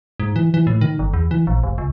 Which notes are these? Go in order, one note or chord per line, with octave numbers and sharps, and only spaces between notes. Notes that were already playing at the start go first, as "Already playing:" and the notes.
G#2
E3
E3
A2
D#3
G1
E2
E3
A#1
F1
C#2